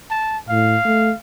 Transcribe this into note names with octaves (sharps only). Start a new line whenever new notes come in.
A5
A2 F5
A3